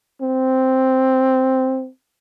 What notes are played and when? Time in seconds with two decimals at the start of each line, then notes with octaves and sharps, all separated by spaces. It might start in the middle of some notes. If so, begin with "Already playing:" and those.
0.21 C4